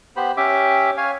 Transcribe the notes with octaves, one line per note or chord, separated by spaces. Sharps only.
B3 G4 C5 B5
C#4 G4 E5 D6
C#5 F5 G#5